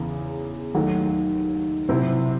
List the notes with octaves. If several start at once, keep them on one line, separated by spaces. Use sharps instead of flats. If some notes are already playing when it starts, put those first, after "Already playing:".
Already playing: E2 C#3 E3
D#2 D#3 F#3 A3
C3 F#3 C4 E4